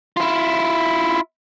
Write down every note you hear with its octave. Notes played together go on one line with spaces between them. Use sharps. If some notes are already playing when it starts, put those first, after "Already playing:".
E4 F4